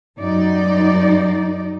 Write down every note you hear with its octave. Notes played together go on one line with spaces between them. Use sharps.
F#2 G3 D#4 D5